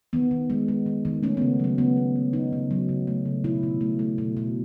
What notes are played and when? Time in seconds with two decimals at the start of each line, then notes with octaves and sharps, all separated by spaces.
0.13 D#3 B3
0.31 D#3
0.50 G#3
0.68 G#3
0.86 D#3
1.05 D#3
1.23 A3 C#4
1.37 C#3 B3
1.59 F#3 C#4
1.78 C#3 B3
1.97 A3
2.16 C#3
2.33 A3 D#4
2.53 C#3
2.71 F#3
2.89 C#3
3.07 A3
3.26 C#3
3.44 B2 E4
3.63 B2
3.81 A3
3.99 A3
4.18 B2
4.37 B2